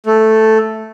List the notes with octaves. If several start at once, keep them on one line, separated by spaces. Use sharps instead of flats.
A3